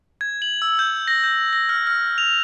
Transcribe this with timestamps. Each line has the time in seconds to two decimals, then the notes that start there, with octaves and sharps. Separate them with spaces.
0.21 G#6
0.42 F#7
0.62 E6
0.79 G6
1.08 A#6
1.24 G6
1.53 A#6
1.69 F6
1.87 F6
2.18 F7